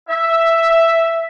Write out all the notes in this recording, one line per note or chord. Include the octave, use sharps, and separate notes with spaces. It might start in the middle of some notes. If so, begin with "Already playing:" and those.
E5